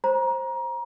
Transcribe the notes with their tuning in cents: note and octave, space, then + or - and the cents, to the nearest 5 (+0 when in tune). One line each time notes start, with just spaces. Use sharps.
C5 +15 A#5 +25